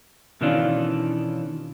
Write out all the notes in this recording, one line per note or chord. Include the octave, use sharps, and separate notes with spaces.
B2 D#3 E3 C#4 D4 F4